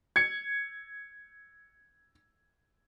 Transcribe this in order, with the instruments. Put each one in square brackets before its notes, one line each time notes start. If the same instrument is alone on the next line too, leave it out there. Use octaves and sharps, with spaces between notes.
[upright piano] G#6 C#7